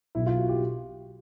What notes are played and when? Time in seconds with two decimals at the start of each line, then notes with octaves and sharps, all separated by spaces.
0.15 B1 B2 E4
0.26 F4
0.38 F#4
0.49 G4